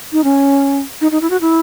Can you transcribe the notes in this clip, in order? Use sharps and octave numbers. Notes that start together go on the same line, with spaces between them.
D#4
C#4
D#4
D#4
E4
F#4
E4